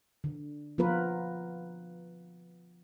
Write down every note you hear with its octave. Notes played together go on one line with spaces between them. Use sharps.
D3
F3 B3 F4 A#4 B4